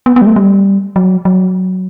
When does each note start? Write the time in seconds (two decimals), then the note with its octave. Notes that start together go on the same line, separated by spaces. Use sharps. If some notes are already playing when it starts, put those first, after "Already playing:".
0.06 B3
0.16 B3
0.21 G3
0.26 A3
0.36 G3
0.96 F#3
1.25 F#3